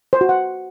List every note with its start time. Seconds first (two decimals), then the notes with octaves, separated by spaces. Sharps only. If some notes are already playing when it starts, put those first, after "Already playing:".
0.13 C5
0.21 F#4
0.29 F#5